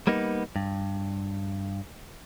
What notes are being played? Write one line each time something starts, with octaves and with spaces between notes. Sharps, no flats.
G3 A#3 B3 D#4
G2